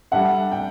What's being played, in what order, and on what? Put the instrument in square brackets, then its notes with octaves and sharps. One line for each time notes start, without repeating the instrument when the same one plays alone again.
[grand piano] G3 D4 A4 E5 [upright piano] F#5
[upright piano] G5